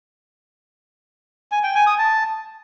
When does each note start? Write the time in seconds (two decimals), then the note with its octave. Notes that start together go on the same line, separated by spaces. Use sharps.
1.52 G#5
1.63 G5
1.75 G#5
1.87 D#6
1.98 A5